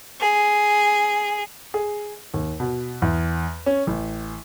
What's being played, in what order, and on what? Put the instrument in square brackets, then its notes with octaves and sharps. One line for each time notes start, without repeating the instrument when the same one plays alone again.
[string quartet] G#4
[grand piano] G#4
D#2
B2
E2
C#4
A1